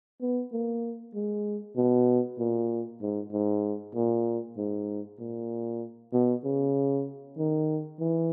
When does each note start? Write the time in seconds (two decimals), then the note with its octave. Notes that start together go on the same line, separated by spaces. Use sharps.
0.21 B3
0.52 A#3
1.15 G#3
1.77 B2
2.39 A#2
3.01 G#2
3.32 G#2
3.95 A#2
4.57 G#2
5.19 A#2
6.13 B2
6.44 C#3
7.37 D#3
8.00 E3